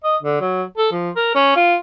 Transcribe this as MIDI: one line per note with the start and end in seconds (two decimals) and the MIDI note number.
0.04 0.17 75
0.23 0.40 50
0.41 0.63 54
0.78 0.89 69
0.92 1.10 53
1.16 1.31 70
1.35 1.55 61
1.56 1.77 65